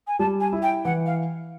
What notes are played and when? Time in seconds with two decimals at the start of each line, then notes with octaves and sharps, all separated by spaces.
0.07 G#5
0.19 G3 A5
0.40 G#5
0.53 E4
0.63 G5
0.85 E3 F#5
1.06 F5